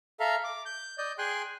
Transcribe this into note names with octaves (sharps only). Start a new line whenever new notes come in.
A4 E5 F5 A#5
D6
G6
D5 D#5 G6
G#4 G5 G#5 C6 F#6